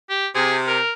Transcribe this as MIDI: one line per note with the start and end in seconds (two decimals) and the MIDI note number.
0.10 0.27 67
0.35 0.78 48
0.35 0.56 68
0.67 0.93 70